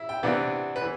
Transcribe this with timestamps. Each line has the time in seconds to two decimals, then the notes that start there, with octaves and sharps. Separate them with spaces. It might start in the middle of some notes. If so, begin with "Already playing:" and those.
Already playing: E4 E5
0.09 G5
0.23 C3 E3 B3 D4
0.76 B4
0.81 E3